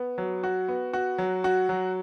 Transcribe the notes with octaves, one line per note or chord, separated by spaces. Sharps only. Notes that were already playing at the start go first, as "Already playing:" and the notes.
Already playing: B3
F#3
F#4
B3
F#4
F#3
F#4
F#3